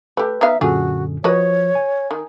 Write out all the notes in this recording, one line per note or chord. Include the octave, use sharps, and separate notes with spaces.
A3 G4 B4
B3 D#4 E5 F5
F#2 A#2 D3 A3 F4 F#4 G#4
F3 F#4 B4 C#5 D#5
G#5
D#3